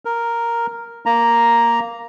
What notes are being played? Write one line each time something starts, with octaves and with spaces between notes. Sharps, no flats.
A#4
A#3 A#5